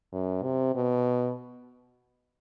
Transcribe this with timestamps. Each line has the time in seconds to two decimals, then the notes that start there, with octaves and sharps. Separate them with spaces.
0.12 F#2
0.42 C3
0.75 B2